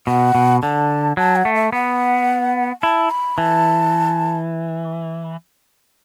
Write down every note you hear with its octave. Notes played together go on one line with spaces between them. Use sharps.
B2 F#5
B2
D3 A5
F#3 A5
F#5
A3
E5
B3 F#5
E4 A5
B5
E3 A5